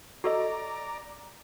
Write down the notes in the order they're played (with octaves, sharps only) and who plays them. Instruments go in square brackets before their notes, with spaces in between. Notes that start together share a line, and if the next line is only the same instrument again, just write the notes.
[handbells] F#4 A4 D#5 [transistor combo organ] D5 A#5